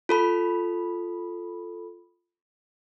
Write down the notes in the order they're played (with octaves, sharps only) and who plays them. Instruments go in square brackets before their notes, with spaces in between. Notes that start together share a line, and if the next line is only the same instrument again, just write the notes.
[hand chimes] F4 A4 B5